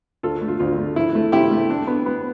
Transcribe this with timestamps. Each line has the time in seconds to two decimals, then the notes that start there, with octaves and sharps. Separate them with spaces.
0.23 D2 F4 A4
0.41 A3
0.48 F4
0.60 D2 F4
0.78 A3
0.96 F3 E4
1.15 A3
1.32 C3 E4 G4
1.51 A3
1.70 D4
1.87 B3
2.06 B3